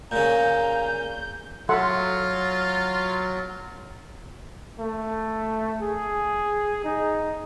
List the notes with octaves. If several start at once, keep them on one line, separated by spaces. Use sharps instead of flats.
A#2 C#3 F5 A#5 G6
F#3 F4 A4 E5 F#5 C6
A3
G#4
D#4